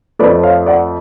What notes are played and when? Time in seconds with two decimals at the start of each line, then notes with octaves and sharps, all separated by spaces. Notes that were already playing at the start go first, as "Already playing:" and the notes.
0.19 F2 F3 A3 B4 D5
0.43 C#5 F5
0.66 D5 F#5